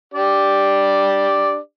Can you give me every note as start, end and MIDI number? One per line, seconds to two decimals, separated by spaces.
0.14 1.58 62
0.14 1.58 67
0.14 1.58 74